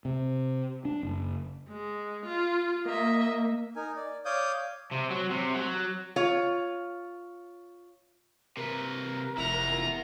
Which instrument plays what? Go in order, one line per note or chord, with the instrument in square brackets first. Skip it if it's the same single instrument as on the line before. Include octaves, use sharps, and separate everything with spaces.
[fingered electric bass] C3
D4
F#1
[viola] G#3
F4
[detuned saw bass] A#3 [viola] D#5 E5
[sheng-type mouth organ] D#4 A#4 G#5
D5
C#5 D5 F5 D6 D#6 G6
[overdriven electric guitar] C3
F#3
C3
F#3
[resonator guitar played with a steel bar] F4 C#5
[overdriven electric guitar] C3 B4 [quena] A#4
[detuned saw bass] F1 [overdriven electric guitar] E4 F#5 [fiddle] A#5